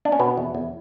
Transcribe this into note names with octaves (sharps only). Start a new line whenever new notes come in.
D4
C#4
B2 B3
E2
E2